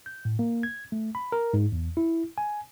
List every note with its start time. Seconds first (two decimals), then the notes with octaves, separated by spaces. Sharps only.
0.06 G6
0.25 A2
0.39 A#3
0.63 G#6
0.92 A3
1.15 B5
1.32 A#4
1.53 G#2
1.72 E2
1.97 E4
2.38 G#5